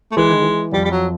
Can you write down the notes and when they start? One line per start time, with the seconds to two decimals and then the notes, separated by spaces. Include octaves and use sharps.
0.11 A3
0.17 E3 G#3
0.29 D#3
0.42 E3
0.72 F2 F3 G3
0.85 G3
0.91 F#3